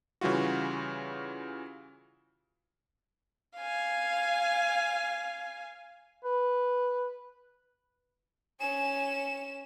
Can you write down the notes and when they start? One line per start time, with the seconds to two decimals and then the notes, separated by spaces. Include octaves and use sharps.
0.21 C#3 E3 G3 F4 F#4
3.57 F5 G#5
6.24 B4
8.60 C#4 G#5 E7